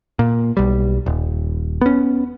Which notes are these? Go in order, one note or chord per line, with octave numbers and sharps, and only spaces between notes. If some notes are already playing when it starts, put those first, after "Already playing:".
A#2
B1 G3
D#1
B3 C#4